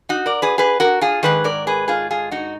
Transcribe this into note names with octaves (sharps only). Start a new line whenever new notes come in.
D#4 F#4
A#4 D5
G#4 B4
G#4 B4
F#4 A#4
F4 G#4
G#2 D#3 G#4 B4
A#4 D5
G#4 B4
F4 G#4
F4 G#4
D#4 F#4